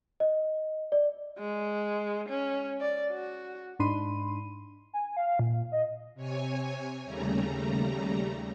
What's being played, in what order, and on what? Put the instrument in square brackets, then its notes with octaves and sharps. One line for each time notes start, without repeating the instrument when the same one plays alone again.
[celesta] D#5
D5
[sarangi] G#3
C#4
D5
F#4
[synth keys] G#2 D4 D#4 B5 C6 D#7
[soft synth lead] G#5
F5
A#2
D#5
[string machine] C3 C#5 G#5
D#2 C#3 G3 A3 A#5